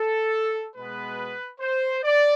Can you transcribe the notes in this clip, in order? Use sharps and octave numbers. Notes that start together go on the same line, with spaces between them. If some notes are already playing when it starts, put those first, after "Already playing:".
Already playing: A4
B2 G#3 B3 B4
C5
D5